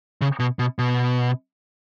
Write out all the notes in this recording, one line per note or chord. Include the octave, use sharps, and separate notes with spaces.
C#3
B2
B2
B2